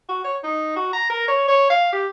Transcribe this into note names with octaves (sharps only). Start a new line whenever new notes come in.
F#4
C#5
D#4
F#4
A#5
A#4
C#5
C#5
F5
G4